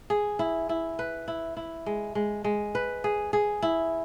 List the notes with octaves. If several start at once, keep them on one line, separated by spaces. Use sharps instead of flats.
G#4
E4
E4
B4
E4
E4
G#3
G#3
G#3
B4
G#4
G#4
E4